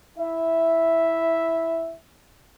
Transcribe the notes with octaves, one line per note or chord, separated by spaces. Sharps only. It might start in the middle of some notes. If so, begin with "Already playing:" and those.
E4 E5